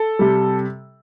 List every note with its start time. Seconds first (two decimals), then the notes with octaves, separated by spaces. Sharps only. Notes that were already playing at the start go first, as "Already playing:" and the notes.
Already playing: A4
0.19 C3 G3